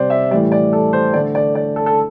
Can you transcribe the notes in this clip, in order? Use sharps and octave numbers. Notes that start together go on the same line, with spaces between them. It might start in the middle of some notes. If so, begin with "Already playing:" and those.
Already playing: C3 G3 C5 D5
E5
A2 E3 G3 D5
D5
A4
C5
D3 A3 D5
D5
D5
A4
A4